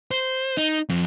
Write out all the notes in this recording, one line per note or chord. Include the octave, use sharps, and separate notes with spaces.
C5
D#4
F2